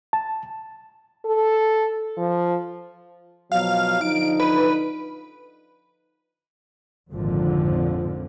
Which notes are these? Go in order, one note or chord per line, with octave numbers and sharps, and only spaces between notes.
A5
A4
F3
B2 F3 F#3 F5
D3 F3 D#4 D7
B4
G#1 F2 A#2 D3 F3